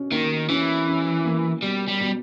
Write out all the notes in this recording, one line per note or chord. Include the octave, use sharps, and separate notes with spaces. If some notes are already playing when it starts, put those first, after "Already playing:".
Already playing: B2 C#4
D#3 A#3
E3 C#4
C#4
A#3
B2 G3
G3
B2